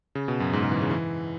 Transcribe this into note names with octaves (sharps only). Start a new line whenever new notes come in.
C#3
B2
F#2
G#2
C#3
E3
C#3
E3